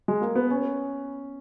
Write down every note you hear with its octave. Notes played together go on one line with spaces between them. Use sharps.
G#3
A#3
B3
C#4